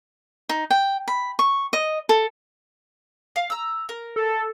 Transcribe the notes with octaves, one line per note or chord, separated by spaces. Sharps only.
D#4
G5
B5
C#6
D#5
A4
F5
A#5 E6
A#4
A4